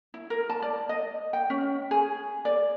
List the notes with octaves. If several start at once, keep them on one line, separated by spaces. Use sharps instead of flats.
E4
A#4
A5
D5
D#5
G5
C#4
G#4
D5